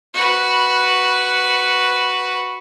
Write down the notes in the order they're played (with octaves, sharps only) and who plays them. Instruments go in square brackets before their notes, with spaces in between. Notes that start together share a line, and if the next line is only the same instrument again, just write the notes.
[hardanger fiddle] F#4 B4